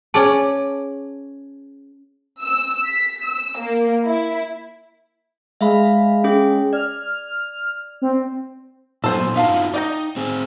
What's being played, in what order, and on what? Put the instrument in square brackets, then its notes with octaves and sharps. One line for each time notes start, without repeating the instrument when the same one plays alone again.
[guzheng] C#4 D5 [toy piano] G#4 A5
[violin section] E6
B6
E6
A#3
E4
[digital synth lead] G#3 [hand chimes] E5 F5 B5
[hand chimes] C#4 G#4
[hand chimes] D5 [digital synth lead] F6
[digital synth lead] C4
[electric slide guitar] A#2 F#3 B3 [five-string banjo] A4 C5 G#5
[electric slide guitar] D#4 F4 F#4 [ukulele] E5 F5 A5
[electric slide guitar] D#4 [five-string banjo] D5 G5 A#5
[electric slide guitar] C4 G#4